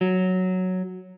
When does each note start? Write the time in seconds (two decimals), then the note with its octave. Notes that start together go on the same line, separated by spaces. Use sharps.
0.01 F#3